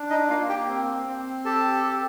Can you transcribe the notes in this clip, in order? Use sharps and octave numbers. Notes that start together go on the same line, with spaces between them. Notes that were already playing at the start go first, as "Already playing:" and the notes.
Already playing: D4
D#4 D#5
A#3 F4 F5
G4 G5
C4
C4
G4 A4 A5
G4